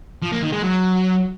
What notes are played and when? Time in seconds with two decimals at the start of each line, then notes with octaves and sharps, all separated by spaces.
0.22 F3
0.32 A#3
0.42 D#3
0.52 G#3
0.62 F#3